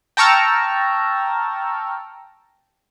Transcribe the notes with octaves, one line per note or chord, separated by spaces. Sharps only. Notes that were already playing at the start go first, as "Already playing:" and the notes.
G5 A5 A#5 C#6 E6 F6